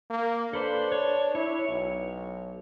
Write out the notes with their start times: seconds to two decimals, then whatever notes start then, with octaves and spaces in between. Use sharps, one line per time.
0.11 A#3
0.53 D4 A4 B4 C5
0.92 C#5
1.35 E4 C#5
1.69 B1